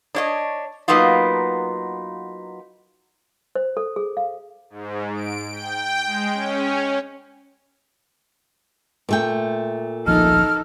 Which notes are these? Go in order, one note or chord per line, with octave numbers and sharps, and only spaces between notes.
D4 C#5 D#5
F#3 A#3 B3 D#4 F4
C5
A4
G#4
F5
G#2
D7
G5
G#3
C#4
A#2 A3 G5
D1 A#1 F3 D#4 A4 F6